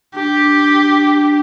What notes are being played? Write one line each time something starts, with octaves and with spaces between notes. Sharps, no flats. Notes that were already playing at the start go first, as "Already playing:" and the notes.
D4 G4